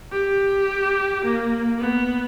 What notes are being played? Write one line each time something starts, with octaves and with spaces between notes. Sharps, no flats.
G4
A#3
B3